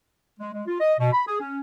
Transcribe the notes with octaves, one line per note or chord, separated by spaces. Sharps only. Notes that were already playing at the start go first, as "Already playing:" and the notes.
G#3
G#3
F4
D#5
B2
B5
G#4
C#4